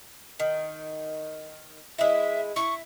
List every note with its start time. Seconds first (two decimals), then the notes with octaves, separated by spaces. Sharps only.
0.40 D#3
1.98 G#3 E4 E5
2.56 E4 C#6